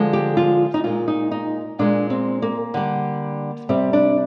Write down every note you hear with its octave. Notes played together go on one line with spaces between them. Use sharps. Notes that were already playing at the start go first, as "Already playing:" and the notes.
Already playing: D3 F3 G#3
G4
F4
D#4
A#2 G#3 F4
D#4
D#4
A#2 G#3 D4
C4
A#3
D3 G3
C3 G3 C4
D4